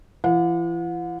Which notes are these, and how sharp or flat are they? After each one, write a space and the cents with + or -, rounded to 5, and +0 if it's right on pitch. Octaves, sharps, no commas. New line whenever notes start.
E3 +45 F#5 -45